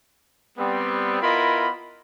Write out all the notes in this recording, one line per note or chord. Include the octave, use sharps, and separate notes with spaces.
G3 B3 C4
B3 E4 F4 A#4 D#5 B5